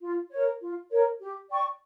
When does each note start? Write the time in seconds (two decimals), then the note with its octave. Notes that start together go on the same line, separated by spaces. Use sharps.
0.01 F4
0.31 A#4 C#5
0.61 F4
0.90 A#4 C#5
1.20 G4
1.49 D5 G5 C#6